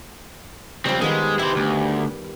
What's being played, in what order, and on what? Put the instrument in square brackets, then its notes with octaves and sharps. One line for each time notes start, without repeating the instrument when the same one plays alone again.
[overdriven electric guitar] C#2 C4 [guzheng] F3 G3
[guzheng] D#3 B3 G4 [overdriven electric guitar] G#3
[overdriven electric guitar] E4 C5 [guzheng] G4
[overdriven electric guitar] D2